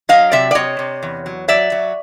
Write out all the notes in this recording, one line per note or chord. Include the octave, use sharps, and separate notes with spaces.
F#3 D#5 F5
C3 D5 E5
D5
C3 C#5 D#5
C3
E2
F#3
F#3 D5 E5
F#3